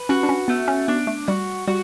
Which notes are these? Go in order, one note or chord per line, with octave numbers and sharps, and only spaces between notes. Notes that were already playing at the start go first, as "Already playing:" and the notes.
Already playing: B4
C#4 F#4
D4
C#4
A3 B3
C#4
B3 D4
A3
G3 F#4
G3 F#4